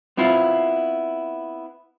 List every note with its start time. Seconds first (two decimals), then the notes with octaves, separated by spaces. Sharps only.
0.17 B3 C4 E4 F4